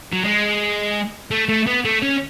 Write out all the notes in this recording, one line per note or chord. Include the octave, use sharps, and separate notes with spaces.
F#3
G#3
A3
A3
B3
A3
C#4